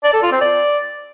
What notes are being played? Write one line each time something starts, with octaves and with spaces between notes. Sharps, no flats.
D5
A4
F4
C4
D5